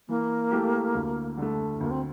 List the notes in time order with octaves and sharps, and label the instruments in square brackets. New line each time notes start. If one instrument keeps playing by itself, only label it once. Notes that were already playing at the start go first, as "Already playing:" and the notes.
[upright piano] E3 [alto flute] A#3
[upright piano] A3 E4 G4
D2
D3 A3
[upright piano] D2 [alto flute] A#3
[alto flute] C4